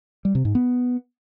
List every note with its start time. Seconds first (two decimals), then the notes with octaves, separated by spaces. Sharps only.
0.25 G3
0.35 C3
0.45 G#2
0.55 B3